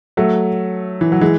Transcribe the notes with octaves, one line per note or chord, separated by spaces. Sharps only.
F#3 A3
E3
F#3
E3 G#3